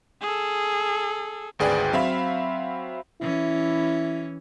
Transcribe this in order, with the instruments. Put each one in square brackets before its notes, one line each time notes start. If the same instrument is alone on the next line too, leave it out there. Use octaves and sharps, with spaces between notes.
[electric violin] G#4 A4
[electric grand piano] G#1 D2 G#4 B4 D5 G5
F#3 C4 E5 F5 B5
[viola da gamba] E3 C#4 [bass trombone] E4